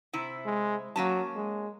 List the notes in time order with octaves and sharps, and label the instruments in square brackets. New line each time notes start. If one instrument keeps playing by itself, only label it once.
[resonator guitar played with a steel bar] C3 E4
[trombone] G#3
[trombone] F#3 [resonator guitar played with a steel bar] A#3 C#4 A5
[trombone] G#3